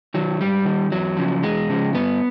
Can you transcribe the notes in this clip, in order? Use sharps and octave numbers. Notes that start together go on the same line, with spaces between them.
D#3 F#3
G#2 G3
D#3
E2 F#3
C#3 F3
E2 G#3
C#3 F3
G2 B3